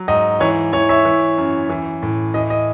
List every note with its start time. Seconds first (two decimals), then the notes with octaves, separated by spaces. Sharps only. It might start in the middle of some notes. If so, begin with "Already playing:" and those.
Already playing: F#3
0.08 G#2 D#5
0.40 E3 C#5
0.73 E3 C#5
0.89 C#5 E5
1.05 E3
1.38 F#2
1.69 E3
2.03 A2
2.34 E3 D#5
2.50 D#5